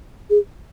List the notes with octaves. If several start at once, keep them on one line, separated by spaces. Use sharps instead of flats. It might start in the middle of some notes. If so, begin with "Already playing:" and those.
G#4